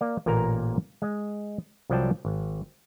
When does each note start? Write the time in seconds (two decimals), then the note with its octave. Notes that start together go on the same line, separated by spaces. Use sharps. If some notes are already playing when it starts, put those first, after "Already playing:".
0.01 A#3 D5
0.26 A1 A#2 A#3 A#4 A#5
1.02 G#3 D#5
1.90 C2 F3 F#3 D5 G5 A5
2.25 G#1